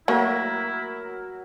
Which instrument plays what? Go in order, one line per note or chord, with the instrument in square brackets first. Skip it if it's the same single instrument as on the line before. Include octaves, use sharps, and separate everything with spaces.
[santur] F#3 A#4 [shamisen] A3 A#3 [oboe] E4